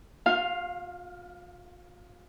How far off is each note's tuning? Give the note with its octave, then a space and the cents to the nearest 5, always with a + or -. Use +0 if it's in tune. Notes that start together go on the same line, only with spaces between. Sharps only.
F4 +40 F5 +0